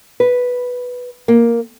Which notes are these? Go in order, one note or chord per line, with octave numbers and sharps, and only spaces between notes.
B4
A#3